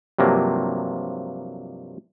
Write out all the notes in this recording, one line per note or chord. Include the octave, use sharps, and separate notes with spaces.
G2 C3 F3 F#3 A#3